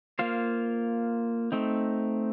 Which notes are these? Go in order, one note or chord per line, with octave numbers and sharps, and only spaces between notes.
A#3 F4 C5 F5
A3 C4 D#4